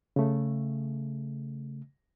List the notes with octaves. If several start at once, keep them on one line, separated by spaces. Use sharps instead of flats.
C#3 A3